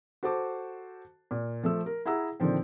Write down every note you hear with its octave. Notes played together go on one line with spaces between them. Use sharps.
F#4 A4 C5 A5 D6
A#2
F3 A3 E6
A#4
E4 G#4 F#5 A#5 E6
A#2 D3 D#3 F3 C4